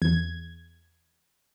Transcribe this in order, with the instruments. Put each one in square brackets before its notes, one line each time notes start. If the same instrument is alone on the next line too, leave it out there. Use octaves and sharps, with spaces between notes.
[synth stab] E2 G#6